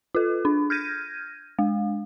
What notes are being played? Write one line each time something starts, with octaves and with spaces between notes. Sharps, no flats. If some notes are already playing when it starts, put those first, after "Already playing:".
F4 A4
D4
F6 G6 G#6 A#6 D#7
G#3